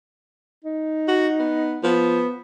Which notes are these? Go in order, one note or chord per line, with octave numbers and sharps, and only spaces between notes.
D#4
F#4
B3
F3 B3